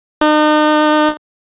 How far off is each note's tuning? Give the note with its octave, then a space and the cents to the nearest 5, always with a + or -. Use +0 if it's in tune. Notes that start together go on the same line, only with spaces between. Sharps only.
D#4 -40